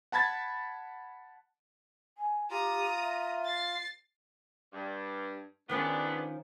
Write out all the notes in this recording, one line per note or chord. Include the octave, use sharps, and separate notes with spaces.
F#5 A5 B5 G#6 A6
G#5
F4 G4 A#5 D#6
E5
A6 C7
G2
G#2 D#3 F3 B3 C#4 D4